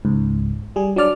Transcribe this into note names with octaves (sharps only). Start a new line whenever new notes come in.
C#2 G#2
G3 G#4
F#3 D4 D5 F6